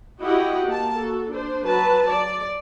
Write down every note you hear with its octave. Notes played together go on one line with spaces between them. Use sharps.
E4 F#4 G4 D#5 F#5
A#3 A5
F#4 A4
D4 C5
F#3 B4 A5
D5